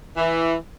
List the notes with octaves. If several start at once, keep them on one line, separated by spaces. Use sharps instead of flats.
E3